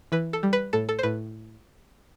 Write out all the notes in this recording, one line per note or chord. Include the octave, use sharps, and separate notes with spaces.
E3 B4
A4
G3
B4
A2 A4
A4
C5
A2 B4